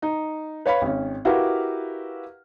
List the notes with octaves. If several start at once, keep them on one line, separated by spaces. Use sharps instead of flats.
D#4
B4 C#5 F5 B5
G#1 C#4
E4 F#4 G4 A#4 B4 F5